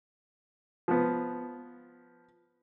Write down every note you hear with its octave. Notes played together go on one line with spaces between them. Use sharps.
F3 B3